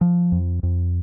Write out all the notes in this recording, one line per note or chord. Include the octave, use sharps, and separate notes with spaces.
F3
F2
F2